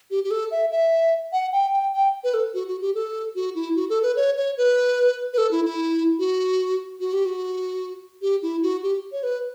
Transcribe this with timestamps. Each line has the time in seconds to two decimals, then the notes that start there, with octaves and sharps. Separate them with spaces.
0.11 G4
0.24 G4
0.31 A4
0.51 E5
0.71 E5
1.32 F#5
1.53 G5
1.73 G5
1.93 G5
2.24 B4
2.34 A4
2.54 F#4
2.67 F#4
2.81 G4
2.95 A4
3.35 F#4
3.55 E4
3.76 F#4
3.90 A4
4.03 B4
4.16 C#5
4.37 C#5
4.57 B4
5.33 B4
5.38 A4
5.51 E4
5.65 E4
6.19 F#4
7.00 F#4
7.13 G4
7.25 F#4
8.22 G4
8.42 E4
8.63 F#4
8.83 G4
9.12 C#5
9.23 B4